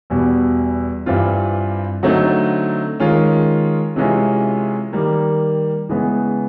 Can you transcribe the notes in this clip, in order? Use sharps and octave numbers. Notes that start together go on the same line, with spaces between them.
E2 B2 G3
G2 E3 G3 C4 F4
D3 F#3 A3 C4 D#4
D#3 G#3 C#4 F4
C3 E3 G#3 C#4 F4
D#3 G3 A#3
C#3 E3 G#3 B3